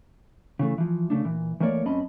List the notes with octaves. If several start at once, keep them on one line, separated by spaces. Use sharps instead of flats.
C#3 E3 A3
E3 F3
C#3 A3 D4
A#2 E3
E3 A3 A#3 A#4 C#5 D5
F#2 C4 C#4 D#5 A5 B5